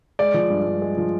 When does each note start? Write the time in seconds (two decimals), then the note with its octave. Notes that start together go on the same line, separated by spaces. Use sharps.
0.19 G#3 D5
0.34 F3
0.50 G2
0.66 G2
0.82 G#3
0.98 F3